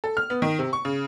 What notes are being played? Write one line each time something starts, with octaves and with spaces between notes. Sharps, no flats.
A4
F6
B3
D#3
C3
C#6
C#3